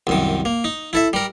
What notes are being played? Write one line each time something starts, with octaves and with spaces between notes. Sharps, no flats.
C2 F#2 D#3
A#3
D#4
E4 A4 E5
G3 A#4